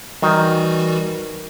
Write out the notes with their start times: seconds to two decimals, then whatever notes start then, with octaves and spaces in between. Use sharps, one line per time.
0.22 D#3 E3 G3 F#4